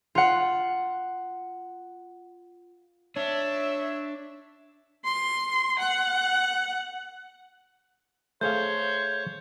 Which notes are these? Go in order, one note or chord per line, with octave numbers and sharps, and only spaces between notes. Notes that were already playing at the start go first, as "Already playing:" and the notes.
F4 F#5
D4 C#5 E5
C6
F#5
A3 G#4 C5 C#5 F5 G6